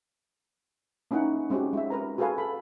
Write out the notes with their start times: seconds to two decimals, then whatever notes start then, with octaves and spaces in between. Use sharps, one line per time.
1.11 A#3 C#4 D#4 E4 F#5
1.50 G#3 C4 C#4 F#4 G4
1.73 G#3 F4 E5
1.90 A#4 B4 A#5
2.18 F#4 G#4 A4 B4 F5 G#5
2.38 A4 B5